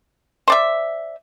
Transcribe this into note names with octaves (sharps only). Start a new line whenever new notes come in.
C5 D5 E5